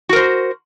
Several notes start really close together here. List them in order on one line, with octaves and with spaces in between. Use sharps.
F#4 A#4 C5